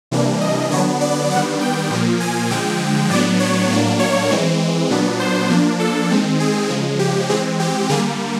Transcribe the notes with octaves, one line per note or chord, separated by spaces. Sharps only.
C3 E3 G3 A#3 D4
D#5
D3 F#3 B3 D4 C#5
D5
D#3 G3 B3 D4 F#5
G5
A#2 F3 A#3
G#5
D3 F3 G#3 G5
A2 F#3 B3 D4 D5
C#5
A2 F#3 A#3 D4
C#5
E3 G#3 C4
A#2 F#3 B3 D4
C5
F3 A#3 D4
A4
D#3 G#3 C4
G#4
C#3 F3 G#3
G4
E3 G#3 C4 G#4
G4
D3 G3 A#3 G#4